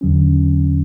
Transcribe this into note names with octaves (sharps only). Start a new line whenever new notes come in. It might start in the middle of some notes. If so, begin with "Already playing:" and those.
E2 D3 F#3 C#4